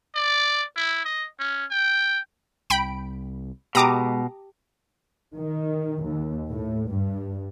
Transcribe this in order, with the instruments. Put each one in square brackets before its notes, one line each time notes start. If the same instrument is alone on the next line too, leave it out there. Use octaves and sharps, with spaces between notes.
[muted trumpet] D5
E4
D#5
C#4
G5
[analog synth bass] C2 [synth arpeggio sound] G5 B5 D7
[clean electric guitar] B2 [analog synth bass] G#3 [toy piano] G4 G5 A5 [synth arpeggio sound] A#5 D6 D#6
[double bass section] D#3
D#2
A2
G2